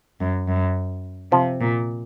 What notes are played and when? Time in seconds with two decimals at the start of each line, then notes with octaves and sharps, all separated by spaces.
0.20 F#2
0.48 F#2
1.32 C3 F3
1.61 A#2